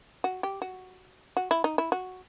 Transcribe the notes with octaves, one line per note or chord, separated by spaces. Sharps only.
F#4
G4
F#4
F#4
E4
D#4
E4
F#4